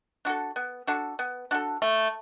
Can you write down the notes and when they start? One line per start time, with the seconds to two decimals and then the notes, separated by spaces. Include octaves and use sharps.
0.25 D4 F#4 A4
0.56 B3
0.87 D4 F#4 A4
1.19 B3
1.51 D4 F#4 A4
1.82 A3